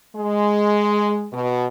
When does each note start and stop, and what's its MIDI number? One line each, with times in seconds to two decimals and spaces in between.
0.15 1.27 56
1.32 1.65 47